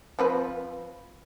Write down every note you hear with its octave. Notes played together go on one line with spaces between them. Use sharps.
F3 C4 B4